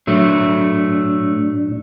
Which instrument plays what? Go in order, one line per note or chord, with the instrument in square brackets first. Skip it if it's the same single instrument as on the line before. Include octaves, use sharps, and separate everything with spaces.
[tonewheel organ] A2 D4 [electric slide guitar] F#3 A3